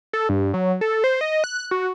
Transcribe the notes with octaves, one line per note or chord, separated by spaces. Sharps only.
A4
G2
F#3
A4
C5
D#5
F#6
F#4